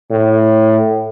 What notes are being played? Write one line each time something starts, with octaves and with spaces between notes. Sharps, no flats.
A2